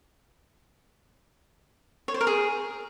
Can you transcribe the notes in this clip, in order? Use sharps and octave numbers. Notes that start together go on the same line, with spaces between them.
C#5
C5
A#4
G#4